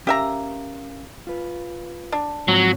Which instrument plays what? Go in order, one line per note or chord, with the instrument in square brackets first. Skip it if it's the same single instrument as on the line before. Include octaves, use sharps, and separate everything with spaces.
[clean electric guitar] C#4 A#4 F5 [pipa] G4 E5 A#5
[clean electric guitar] F4 B4
[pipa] D4
[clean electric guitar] G#2 F3 C4 [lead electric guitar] F#3